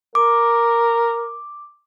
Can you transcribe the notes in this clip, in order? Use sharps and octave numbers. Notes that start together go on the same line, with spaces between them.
A#4 D6